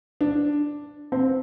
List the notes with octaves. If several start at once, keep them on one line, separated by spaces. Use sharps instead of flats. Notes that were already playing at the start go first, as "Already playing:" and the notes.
D4
C4